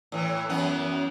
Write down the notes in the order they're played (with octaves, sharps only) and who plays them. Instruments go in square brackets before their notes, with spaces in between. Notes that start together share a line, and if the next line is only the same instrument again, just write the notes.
[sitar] A2 E3
F#2 E3 B3